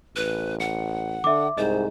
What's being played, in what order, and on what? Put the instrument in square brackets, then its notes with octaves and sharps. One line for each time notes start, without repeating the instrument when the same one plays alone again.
[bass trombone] A1 [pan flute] B4
[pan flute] F#5 [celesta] C#7
[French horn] D3 [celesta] E5 D6
[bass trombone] C2 [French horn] G#2 [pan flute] C5 [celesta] D#5